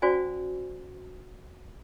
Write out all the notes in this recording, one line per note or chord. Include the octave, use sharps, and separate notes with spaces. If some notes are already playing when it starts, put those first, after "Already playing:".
C#4 F#4 C5 D5 G#5